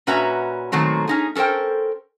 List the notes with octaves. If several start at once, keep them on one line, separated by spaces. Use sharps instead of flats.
A#2 C#4 F#4 B4 E5 A#5
A#2 D#3 F#3 A3 C4
C#4 D#4 G#4
C#4 A4 A#4 C5 G5